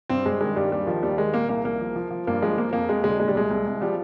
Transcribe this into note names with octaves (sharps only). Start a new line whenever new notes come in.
G2 C4
G2 G#3
D#3 G#3
G2 G3
D#2 G3
D#3 F3
D#2 G3
D#3 G#3
A#2 A#3
C2 A#3
C2 A#3
F3
F3
F3
G2 A#3
F3 G#3
F3 A#3
F2 A#3
F2 G#3
D3 G#3
A#2 G#3
G3
C2 G#3
C2
C2
F3 G3